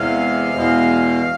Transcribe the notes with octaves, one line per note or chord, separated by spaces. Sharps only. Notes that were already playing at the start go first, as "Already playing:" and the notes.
Already playing: E2 C3 G#3 F5
E2 B2 G#3